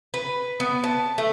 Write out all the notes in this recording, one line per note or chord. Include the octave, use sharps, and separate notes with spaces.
B4
B3
A5
A3